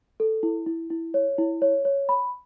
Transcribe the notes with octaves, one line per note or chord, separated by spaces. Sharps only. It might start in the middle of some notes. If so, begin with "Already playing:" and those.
A4
E4
E4
E4
C#5
E4
C#5
C#5
B5